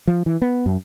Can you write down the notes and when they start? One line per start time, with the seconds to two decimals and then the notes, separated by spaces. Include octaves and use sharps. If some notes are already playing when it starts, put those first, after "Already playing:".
0.07 F3
0.26 E3
0.42 B3
0.66 F#2